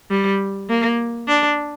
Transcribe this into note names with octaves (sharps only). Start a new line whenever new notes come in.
G3
A#3
D4